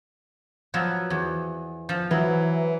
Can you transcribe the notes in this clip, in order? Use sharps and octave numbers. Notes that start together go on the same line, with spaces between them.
F3 F#3 B3
E2
F3
E3 F#3